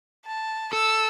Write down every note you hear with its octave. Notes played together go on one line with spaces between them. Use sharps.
A5
A4 E6